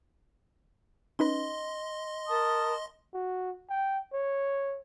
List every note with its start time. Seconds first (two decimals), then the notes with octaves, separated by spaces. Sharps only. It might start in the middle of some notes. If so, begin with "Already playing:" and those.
1.19 C#4 D#4 B4 D#5 C6
2.28 A#4 A5 D#6
3.14 F#4
3.69 G5
4.13 C#5